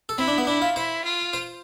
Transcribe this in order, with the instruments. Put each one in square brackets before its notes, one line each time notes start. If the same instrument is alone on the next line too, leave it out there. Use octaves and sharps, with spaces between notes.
[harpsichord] A4
[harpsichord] C4 [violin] E4
[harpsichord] D4
B3
[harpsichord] D4 [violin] E4
[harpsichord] F4
[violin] E4 [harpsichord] C5
[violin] F4
[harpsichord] C5